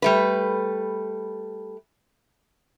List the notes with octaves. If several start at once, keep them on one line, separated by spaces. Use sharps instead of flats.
G3 A3 B4